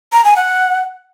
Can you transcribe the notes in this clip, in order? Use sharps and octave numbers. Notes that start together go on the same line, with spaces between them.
A#5
G#5
F#5